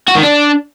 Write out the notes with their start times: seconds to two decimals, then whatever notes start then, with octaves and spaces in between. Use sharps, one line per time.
0.08 F#4
0.15 D#3
0.23 D4